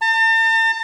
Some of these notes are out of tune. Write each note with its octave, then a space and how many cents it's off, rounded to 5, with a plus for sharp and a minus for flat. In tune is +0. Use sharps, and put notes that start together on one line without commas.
A5 +45